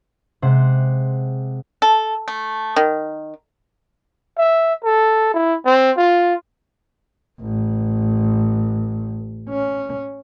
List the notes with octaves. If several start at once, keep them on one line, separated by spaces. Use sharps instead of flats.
C3 G#3 C5 F#5
A4
A3
D#3
E5
A4
E4
C4
F4
A1
C#4